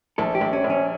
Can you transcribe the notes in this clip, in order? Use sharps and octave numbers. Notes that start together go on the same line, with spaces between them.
A#1 A4
G4
A#1
C#4
A#1
C#4